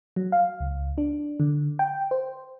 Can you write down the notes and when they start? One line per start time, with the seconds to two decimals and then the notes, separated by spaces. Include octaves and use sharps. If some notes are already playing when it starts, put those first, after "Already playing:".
0.16 F#3
0.32 F5
0.60 C#2
0.98 D4
1.40 D3
1.79 G5
2.11 C5